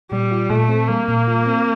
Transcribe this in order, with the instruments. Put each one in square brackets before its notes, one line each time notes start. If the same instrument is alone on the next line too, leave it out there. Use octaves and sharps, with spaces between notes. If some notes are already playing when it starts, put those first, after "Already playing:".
[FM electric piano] A#2 [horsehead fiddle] G3
[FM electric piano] F4
[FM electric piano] A#2 [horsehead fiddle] A3
[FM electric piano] C4
[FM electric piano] G3 [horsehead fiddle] A#3
[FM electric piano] A#2
F4
C4